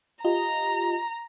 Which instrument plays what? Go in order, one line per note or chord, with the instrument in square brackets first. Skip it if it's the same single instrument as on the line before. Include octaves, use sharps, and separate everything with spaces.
[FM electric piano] F4 G4 D#5 [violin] A#5